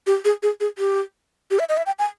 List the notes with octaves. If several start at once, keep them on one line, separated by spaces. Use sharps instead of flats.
G4
G#4
G#4
G#4
G4
G4
E5
D#5
E5
G5
G#5